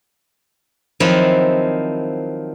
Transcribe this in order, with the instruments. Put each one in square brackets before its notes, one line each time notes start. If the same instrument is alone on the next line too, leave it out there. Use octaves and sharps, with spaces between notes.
[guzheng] D#3 F3 F#3 C4 E4